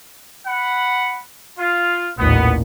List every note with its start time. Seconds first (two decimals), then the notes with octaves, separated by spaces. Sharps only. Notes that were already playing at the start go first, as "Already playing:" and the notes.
0.47 F#5 B5
1.57 F4
2.18 A1 D#2 A#2 B3